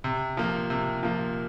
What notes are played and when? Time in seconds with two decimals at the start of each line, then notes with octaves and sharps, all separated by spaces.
0.04 C3
0.37 F3 A#3
0.70 C3
1.03 F3 A#3